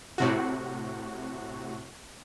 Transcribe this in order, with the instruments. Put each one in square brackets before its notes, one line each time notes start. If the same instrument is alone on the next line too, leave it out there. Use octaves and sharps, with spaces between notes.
[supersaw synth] A2 C3 F#4